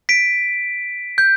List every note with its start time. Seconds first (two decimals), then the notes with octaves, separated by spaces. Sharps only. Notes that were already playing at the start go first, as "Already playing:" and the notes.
0.09 B6 D7
1.18 G6